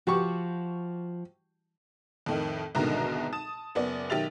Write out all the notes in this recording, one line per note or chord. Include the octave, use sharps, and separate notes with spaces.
F3 F#4 G4 C#6
F2 A2 D#3
C2 G#2 B2 D3 D#3 A#5
A5 D#6 E7
F#1 B3 D5
B1 D#3 G4 E5 A6 F7